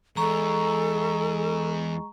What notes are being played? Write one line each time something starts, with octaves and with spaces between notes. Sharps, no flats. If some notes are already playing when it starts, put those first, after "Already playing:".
E2 G#3 A4 A#5 C#6